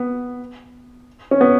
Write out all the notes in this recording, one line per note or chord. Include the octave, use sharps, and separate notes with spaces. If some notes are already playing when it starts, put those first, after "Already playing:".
Already playing: B3
C#4
B3